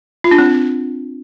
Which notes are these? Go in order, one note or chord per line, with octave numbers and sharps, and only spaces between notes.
F4
D4
C4